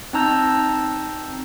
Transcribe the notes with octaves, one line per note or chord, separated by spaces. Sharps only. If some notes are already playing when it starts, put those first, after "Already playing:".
C4 D#4 A5 A#5 E6 G6